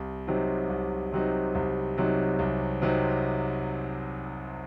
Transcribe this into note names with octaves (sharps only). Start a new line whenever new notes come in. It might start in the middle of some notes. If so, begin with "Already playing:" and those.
Already playing: C2
C3 F#3 C4 D#4
C2
C3 F#3 C4 D#4
C2
C3 F#3 C4 D#4
C2
C3 F#3 C4 D#4